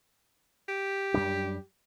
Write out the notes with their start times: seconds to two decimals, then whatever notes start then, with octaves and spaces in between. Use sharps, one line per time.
0.69 G4
1.14 F#2 G3 D4